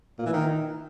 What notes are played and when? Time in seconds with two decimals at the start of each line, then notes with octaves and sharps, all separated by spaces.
0.19 A#2
0.26 E3
0.33 D#3